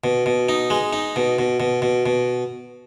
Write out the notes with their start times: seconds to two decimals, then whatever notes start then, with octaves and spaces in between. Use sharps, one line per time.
0.04 B2
0.26 B2
0.49 D#4
0.70 G#3
0.93 D#4
1.16 B2
1.39 B2
1.60 B2
1.82 B2
2.06 B2